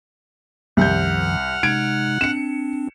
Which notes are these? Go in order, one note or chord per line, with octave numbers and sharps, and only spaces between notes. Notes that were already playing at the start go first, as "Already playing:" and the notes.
C2 F#2 D#3 F3 F#5 F6 G6
C3 G#3 D#4 G#6 D7
C4 D4 C#7 E7